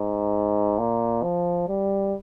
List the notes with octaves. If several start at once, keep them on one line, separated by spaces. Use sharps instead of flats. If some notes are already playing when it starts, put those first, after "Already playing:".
Already playing: G#2
A#2
F3
G3